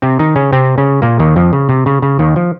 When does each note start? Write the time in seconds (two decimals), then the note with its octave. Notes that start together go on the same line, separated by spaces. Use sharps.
0.02 C3 C4
0.19 D#3 D#4
0.36 C#3 C#4
0.52 C3 C4
0.78 C#3 C#4
1.02 A#2 A#3
1.19 D#2 D#3
1.36 F2 F3
1.53 C#3
1.69 C3
1.86 C#3
2.02 C#3
2.19 D#2 D#3
2.36 F3